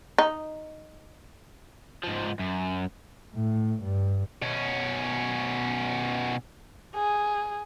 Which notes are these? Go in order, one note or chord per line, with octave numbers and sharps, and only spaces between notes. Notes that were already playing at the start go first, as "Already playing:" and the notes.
D#4
G#2 F3
F#2
A2
G2
B2 C#4
G#4